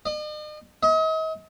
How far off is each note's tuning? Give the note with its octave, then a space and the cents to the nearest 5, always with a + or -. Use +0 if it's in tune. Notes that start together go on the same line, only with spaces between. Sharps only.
D#5 -45
D#5 +40